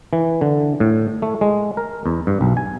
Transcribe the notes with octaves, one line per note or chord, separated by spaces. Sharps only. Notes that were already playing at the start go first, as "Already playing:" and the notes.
E3
D3
A2
A3
G#3
A#4
E2
G2
B1
G#5